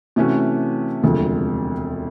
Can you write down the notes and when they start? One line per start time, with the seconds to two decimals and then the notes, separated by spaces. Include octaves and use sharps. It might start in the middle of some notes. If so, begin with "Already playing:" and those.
0.16 C3 E3 A3 C#4 F#4
1.03 E1 D2 C3 F3 G#3